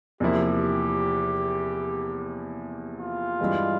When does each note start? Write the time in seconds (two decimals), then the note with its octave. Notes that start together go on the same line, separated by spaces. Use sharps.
0.20 E2 C3 F3 A#3 E4 G4
3.00 F4
3.40 G2 E3 G#3